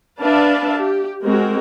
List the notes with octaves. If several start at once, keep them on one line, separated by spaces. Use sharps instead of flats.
D4 B4 E5 F5 A5
G4
G#3 C4 F#4 A#4